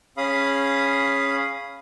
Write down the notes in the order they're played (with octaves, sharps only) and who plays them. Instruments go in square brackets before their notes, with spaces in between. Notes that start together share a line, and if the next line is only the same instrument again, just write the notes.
[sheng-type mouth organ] C#4 G#4 F5 B5 D#6